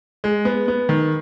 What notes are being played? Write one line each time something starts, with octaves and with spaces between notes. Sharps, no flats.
G#3
B3
B3
D#3